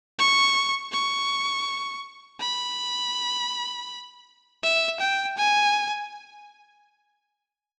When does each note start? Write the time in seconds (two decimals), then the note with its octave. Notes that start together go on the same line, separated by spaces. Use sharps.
0.19 C#6
0.92 C#6
2.41 B5
4.63 E5
5.00 G5
5.37 G#5